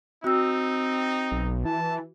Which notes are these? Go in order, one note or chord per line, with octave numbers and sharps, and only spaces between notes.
C4 D#4 F#4 E6
B1
E3 A5